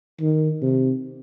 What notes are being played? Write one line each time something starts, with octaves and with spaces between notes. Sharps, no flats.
D#3
C3